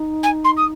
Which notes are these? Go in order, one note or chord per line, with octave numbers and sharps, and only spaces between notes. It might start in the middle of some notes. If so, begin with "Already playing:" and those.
Already playing: D#4
G#5
C6
D#6